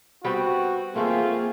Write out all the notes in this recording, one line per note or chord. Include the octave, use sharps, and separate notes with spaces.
G3 B3 C4 F#4
A3 A#3 C4 F4 G#4 E5